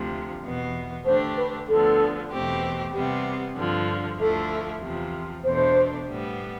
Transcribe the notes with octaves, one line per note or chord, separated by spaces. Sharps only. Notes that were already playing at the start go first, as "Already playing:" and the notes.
Already playing: D2 C3 F3
E2 B2 B3
D3 A3 D4 G4 C5
B4
D2 D3 F3 B3 A4
E2 B2 A3 C4 G4
C3 G3 B3 G4
G2 D3 F3
D2 D3 F3 A3 E4 A4
E2 C3 F3
E2 B2 A3 D4 C5
A2 G3 B3